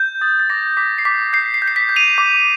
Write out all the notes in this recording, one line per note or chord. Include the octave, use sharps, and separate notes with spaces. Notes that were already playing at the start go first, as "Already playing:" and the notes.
Already playing: G6
D#6 A6
A6
D6 A#6
D6 B6
C7
D6 B6
G6 C7
C7
G6
C7
B6
G6
D#7 F7
D6